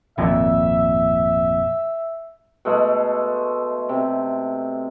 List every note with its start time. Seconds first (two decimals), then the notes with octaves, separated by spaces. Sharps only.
0.18 G#1 F2 A#2 E5
2.65 B2 G#3 A3
3.89 C3